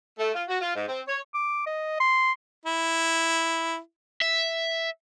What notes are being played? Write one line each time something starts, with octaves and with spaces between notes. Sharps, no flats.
A3
F4
F#4
F4
G#2
C4
C#5
D6
D#5
C6
E4
E5